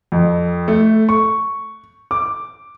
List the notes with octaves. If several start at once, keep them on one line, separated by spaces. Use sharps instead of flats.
F2
A3
C#6
D6